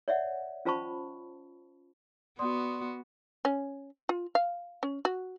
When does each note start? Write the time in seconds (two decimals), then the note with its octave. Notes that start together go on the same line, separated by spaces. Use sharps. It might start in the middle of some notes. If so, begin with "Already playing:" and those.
0.08 C#5 D5 E5 F#5
0.65 C#4 F4 C5 A5 B5 C#6
2.39 B3 F#4 D5 C6 D#6
3.45 C#4
4.09 F4
4.35 F5
4.83 C#4
5.05 F#4